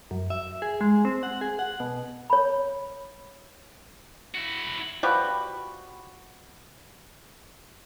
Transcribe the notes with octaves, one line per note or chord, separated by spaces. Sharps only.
F#2
E5
G#4
G#3
C4
F#5
G#4
F#5
B2
C#5 B5
E4 F#4
F3 G3 F#4 B4